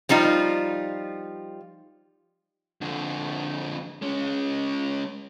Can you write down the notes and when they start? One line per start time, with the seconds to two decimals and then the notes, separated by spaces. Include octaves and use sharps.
0.09 F3 G3 D#4 F4
2.81 F2 D3
4.02 G#3 C#4